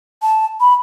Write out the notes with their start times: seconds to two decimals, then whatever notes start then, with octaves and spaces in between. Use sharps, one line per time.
0.22 A5
0.60 B5